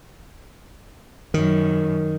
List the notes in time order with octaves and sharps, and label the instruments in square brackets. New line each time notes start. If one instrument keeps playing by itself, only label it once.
[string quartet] F#2 [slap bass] D#3